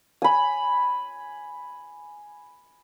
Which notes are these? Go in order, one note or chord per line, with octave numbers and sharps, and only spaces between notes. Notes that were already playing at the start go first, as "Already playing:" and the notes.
G#5 B5